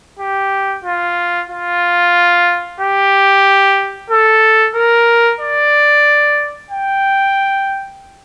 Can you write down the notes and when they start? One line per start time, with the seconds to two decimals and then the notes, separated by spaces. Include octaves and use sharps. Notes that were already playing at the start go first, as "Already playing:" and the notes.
0.19 G4
0.84 F4
1.49 F4
2.80 G4
4.10 A4
4.75 A#4
5.40 D5
6.71 G5